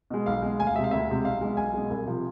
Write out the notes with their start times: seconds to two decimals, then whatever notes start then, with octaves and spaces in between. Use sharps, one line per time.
0.10 B2 G#3
0.26 B1 F5
0.42 B2 G#3
0.59 D2 G#5
0.67 F5
0.75 G#3 E5
0.78 C3
0.84 F5
0.91 D2 E5
1.08 C3 G#3
1.24 B1 F5
1.41 B2 G#3
1.57 B1 G#5
1.73 B2 G#3
1.90 C2
2.06 C3 F3